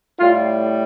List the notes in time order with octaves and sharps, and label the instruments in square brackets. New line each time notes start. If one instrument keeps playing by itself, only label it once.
[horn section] A2 G3 F4